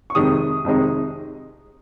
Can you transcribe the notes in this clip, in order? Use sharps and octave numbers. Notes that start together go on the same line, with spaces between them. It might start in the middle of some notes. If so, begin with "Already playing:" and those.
C#6
F2 C3 D#3 G#3 D#4 D#6
F2 C3 D#3 G#3 D#4